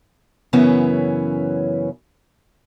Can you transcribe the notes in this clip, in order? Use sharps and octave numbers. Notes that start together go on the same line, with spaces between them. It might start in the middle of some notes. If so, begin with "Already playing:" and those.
F#2 C#3 E3 B3 C#4